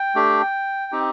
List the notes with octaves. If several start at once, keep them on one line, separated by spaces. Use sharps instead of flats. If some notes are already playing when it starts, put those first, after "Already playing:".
Already playing: G5
A3 D4 G4
C4 D#4 G4